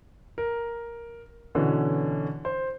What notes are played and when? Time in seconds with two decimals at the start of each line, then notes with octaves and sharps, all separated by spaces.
0.38 A#4
1.55 B2 D3 E3 C#4
2.45 C5